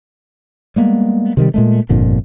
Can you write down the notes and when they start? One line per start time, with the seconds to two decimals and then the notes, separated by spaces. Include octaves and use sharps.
0.76 G3 G#3 A#3 B3
1.37 C3 D#3 F#3 G3
1.54 A#2 G#3 A3
1.89 G1 F2 A#2 D3